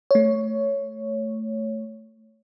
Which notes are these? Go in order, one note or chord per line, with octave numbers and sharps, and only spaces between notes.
A3 C#5